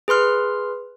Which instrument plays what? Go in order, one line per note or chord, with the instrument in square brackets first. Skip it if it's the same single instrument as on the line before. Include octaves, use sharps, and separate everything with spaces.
[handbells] G#4 B4 C6 F6